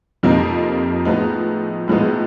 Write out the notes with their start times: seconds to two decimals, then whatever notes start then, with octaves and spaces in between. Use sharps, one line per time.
0.23 F2 C3 F3 A#3 D#4
1.05 A2 F3 G#3 B3 D#4
1.88 A2 F3 G#3 B3 D#4